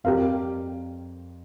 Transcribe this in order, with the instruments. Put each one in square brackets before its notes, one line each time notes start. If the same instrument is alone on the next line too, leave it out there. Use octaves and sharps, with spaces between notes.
[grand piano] F2 [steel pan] G4 A#4 F5